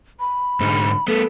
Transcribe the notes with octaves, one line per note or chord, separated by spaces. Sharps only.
B5
G#2 D3 D#4
A3 B3 A4